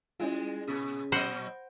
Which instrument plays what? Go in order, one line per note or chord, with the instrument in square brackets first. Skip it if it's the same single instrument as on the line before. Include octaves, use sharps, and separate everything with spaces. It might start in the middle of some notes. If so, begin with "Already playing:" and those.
[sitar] G3 G#3 [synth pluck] C#4 E4 F4
[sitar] A#2 B3 G#4 [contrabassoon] C#3 [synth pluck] D#6 B6
[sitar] A#2 F#3 D#5 [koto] C5 F#5 [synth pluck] B5 A#6 D7